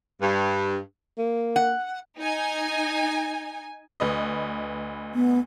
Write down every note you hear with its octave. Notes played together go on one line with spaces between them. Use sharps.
G2
A#3
F#5
D#4 G#5
D2 B4 D#5
B3